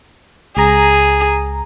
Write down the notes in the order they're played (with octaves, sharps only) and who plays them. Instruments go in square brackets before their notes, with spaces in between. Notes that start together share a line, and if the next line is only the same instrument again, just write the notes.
[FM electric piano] C#2 A#5 [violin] G#4